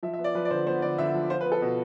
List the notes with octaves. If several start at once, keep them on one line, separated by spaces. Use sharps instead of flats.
F3 E5
E5
B3
D5
F3 B4
D5
D3 C5
B3 C5
D3 D5
D3 E5
F3
F4 C5
B4
B3
A4
B2